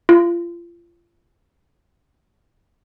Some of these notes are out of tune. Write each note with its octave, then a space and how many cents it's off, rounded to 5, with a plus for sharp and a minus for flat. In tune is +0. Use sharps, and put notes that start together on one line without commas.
F4 -30